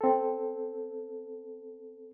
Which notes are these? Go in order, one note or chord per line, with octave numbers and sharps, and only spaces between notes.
C4 A4